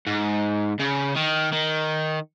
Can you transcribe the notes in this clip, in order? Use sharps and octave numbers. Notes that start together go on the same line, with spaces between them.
G#2
C#3
D#3
D#3